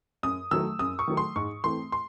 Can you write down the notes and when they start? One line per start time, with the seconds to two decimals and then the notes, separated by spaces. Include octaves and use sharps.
0.23 F#2 D#6
0.51 D#3 F#3 A3 E6
0.79 F#2 D#6
0.99 C#6
1.08 D#3 F#3 A3
1.17 C6
1.36 G#2 C#6
1.64 E3 A3 C4 C6
1.92 C6